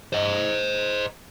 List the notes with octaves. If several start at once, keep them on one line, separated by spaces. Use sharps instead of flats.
C5 D#5